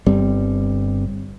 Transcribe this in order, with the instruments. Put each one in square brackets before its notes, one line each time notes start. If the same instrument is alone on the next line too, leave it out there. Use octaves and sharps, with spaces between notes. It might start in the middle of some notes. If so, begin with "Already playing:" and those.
[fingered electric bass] G1 G3 C4